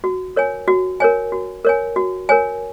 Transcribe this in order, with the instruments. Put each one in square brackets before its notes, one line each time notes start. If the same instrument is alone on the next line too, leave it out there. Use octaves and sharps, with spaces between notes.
[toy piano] F#4
A#4 C#5 G#5
F#4
A#4 C#5 G#5
F#4
A#4 C#5 G#5
F#4
A#4 C#5 G#5